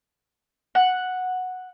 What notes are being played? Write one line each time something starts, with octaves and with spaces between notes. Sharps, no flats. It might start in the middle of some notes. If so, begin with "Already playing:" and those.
F#5